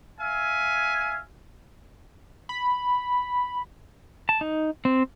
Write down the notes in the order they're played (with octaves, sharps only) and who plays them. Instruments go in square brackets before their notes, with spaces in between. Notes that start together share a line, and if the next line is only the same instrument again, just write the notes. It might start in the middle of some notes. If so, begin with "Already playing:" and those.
[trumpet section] E5 F5 G#5
[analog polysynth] B5
[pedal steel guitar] A5
D#4
C4